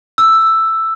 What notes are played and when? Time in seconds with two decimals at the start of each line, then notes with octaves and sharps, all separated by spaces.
0.18 E6